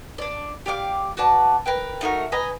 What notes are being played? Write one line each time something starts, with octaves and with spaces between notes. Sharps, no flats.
D4 D5
G4 D5 F5 D6
F#4 B4 D5 A5
A#4 B4 G5
A3 D#4 F#4 A#4
B4 D#5 G#5 A#5